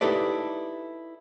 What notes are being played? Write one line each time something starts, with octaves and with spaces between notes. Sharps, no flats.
D#4 E4 G4 A4 B4 D5